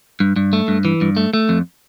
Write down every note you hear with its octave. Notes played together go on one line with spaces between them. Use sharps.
G2
G2
A3
G2
E3
G2
A3
A3
F2